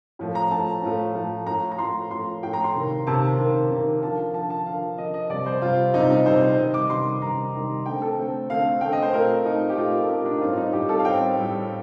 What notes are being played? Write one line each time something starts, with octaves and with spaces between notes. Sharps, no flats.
A2 F3 A3
A#5
A2 F3 A3 A5
A2 F3 A3
A2 F3 A3
A2 F3 A3 A#5
A#5
A2 F3 A3 C6
A2 F3 A3 C6
A2 F3 A3 G5
A#5
C6
C3 D#3 A#3
C3 D#3 A#3 A5
C3 D#3 A#3
C3 D#3 A#3
D3 F3 A#3 A5
D3 F3 A#3 A5
A5
D3 F3 A#3 F5
D3 F3 A#3 D#5
D#5
C3 G3 C4 D5
C5
C3 G3 C4 F4
C3 G3 C4 D#4
D#4
C3 G3 C4 C5
C5
C3 D#3 G3 D#5
D6
C3 D#3 G3 C6
C3 D#3 G3 A#5
C3 D#3 G3
D3 A3 C4 G5
A4
D3 A3 C4
D3 A3 C4 F5
D3 A3 C4 G5
D#5
C5
A#2 A3 C4 A#4
A#2 A3 C4 D#4
G4
A#2 A3 C4 F4
A4
A#2 A3 C4 G4
D4
D#4
A2 G3 C4 F4
D#4
A2 G3 C4 G4
A4
F5
A2 G3 C4 G5
A2 G3 C4